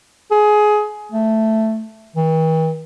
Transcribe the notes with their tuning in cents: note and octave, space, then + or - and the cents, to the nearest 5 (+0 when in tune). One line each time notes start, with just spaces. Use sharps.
G#4 +20
A3 +5
E3 -45